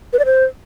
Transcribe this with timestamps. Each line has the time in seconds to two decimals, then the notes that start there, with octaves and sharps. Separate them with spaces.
0.13 B4
0.19 D5
0.25 C5